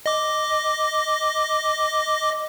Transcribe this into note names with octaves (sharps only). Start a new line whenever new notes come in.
D#5 D6